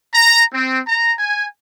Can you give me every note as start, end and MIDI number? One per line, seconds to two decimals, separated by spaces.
0.14 0.44 82
0.53 0.81 60
0.87 1.14 82
1.19 1.46 80